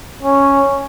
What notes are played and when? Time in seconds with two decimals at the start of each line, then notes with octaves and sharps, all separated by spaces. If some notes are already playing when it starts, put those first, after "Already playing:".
0.23 C#4